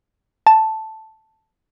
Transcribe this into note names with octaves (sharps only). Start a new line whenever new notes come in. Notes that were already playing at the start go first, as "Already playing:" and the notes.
A5